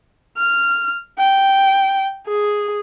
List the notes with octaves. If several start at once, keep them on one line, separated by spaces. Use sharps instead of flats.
F6
G5
G#4